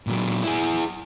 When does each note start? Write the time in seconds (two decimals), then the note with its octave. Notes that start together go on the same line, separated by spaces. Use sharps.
0.07 A#2 F#3
0.44 E4 G#4